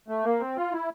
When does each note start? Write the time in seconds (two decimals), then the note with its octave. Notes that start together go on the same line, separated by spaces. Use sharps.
0.08 A3
0.25 A#3
0.40 C4
0.56 F4
0.73 E4